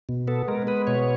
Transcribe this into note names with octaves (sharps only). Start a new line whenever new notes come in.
B2
B3 A4
G#3 A#4
B3 B4
B2 C#5